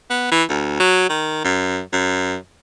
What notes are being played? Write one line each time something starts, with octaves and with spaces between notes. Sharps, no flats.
B3
E3
D2
F#3
D#3
F#2
F#2